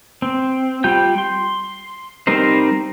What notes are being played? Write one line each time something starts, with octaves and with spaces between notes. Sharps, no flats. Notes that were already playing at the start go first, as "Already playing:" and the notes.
C4
G3 F4 G5 G6
C6
G3 C4 D#4 A#4 C5